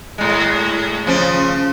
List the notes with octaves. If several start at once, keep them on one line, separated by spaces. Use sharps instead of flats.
A2 G#3
C#3 F3 C#4